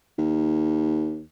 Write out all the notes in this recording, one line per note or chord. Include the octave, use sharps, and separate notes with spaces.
D#2